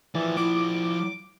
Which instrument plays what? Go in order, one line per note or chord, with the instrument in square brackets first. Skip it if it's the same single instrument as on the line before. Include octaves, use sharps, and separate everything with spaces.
[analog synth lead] E3 [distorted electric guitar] F3 D5
[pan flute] E4 [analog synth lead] D6